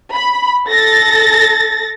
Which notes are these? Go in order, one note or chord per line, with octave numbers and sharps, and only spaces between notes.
B5
A4 A6 A#6